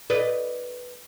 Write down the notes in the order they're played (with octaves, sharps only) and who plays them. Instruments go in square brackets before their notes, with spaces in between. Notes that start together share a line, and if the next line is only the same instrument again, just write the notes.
[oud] B4 D5 D#5